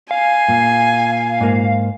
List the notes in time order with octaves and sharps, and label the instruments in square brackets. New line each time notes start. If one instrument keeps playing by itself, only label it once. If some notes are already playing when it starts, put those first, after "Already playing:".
[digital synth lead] F5 [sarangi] G#5
[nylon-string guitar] A#2
[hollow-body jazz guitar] G#2 A#3